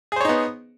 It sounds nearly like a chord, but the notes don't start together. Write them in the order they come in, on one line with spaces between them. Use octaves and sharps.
G#4 C5 C#5 D#4 B3